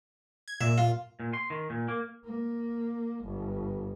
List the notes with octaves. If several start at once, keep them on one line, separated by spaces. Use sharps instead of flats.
G#6
A#2 E5
F4
A#2
C6
D#3
A#2
A#3
A#3
G1